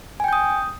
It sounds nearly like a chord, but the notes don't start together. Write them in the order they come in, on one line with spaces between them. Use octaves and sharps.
G#5 G5 G6 D#6